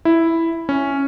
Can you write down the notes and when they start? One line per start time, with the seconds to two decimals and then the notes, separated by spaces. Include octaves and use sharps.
0.05 E4
0.69 C#4